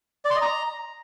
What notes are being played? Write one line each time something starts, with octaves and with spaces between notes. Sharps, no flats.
D5
C6
D#5
A#5